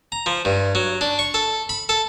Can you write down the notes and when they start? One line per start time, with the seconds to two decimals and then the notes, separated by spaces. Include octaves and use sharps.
0.12 A#5
0.26 F3
0.45 G2
0.75 F#3
1.01 D4
1.19 C#6
1.34 A4
1.69 B5
1.89 A4